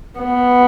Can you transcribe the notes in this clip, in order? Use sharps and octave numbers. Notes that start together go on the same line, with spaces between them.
B3